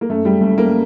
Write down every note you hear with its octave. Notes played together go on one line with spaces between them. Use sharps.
A#3
F#2 A3
G3
F#1 A3
A#3